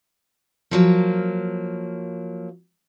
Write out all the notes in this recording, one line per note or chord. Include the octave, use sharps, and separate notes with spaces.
F3 F#3 A#3